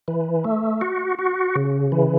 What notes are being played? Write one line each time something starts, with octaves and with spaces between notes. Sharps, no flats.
E3
A3
F#4
F#4
C#3
E3